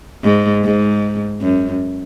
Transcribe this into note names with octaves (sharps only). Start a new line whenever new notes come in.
G#2
G#2
F#2